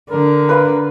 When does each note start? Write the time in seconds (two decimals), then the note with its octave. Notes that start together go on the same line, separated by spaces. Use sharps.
0.10 D3 A#4
0.49 B4 F5 B5